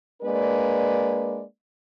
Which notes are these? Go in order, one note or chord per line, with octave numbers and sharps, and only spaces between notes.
G#3 A#3 D4 B4 D5